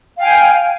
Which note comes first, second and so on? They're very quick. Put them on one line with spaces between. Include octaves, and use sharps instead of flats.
F5 G5 G#5